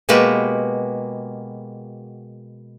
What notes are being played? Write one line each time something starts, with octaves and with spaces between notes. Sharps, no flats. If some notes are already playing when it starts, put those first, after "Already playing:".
B2 G#3 A#3 F#4 G4 B4